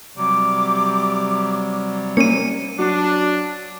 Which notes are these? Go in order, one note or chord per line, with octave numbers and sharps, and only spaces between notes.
C3 F#3 G3 D6
A#3 C#4 C#7 D#7
F#3 D4